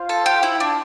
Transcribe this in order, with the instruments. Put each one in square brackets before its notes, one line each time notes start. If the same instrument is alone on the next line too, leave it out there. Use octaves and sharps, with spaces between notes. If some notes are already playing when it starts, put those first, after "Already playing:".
Already playing: [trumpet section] F4 C5 F5
[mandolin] A4
G4
E4
D4